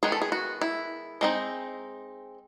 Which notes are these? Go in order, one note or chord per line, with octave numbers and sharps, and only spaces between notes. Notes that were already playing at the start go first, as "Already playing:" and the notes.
D#3 G#3 B3 G#4
A4
G#4
F#4
E4
G#3 C4 D#4